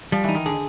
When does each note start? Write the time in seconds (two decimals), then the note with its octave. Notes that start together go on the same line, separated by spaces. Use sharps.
0.12 F3 G3
0.24 E3 D#4
0.35 D#3
0.46 D3 G#4